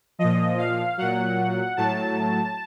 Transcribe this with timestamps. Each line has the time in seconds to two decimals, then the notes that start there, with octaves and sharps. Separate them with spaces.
0.19 A#2 F3 D#5
0.58 F5
0.98 A#2 F#3 F#5
1.77 A2 F#3 A5